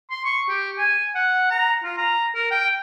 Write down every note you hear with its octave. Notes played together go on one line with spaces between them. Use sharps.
C6
C#6
G4
G#5
F#5
A#5
F4
A#5
A#4
G5